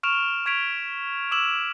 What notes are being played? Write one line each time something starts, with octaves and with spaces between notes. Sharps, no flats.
C#6 F6 D7 E7 F7
C#6 G#6 B6 D7 F7
D6 E6 E7 F#7